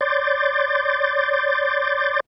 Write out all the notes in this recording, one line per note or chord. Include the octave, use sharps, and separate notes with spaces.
C#5 D5 C6 D6 G6 A6